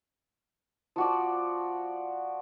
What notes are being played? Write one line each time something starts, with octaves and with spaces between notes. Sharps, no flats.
F3 F#4 D5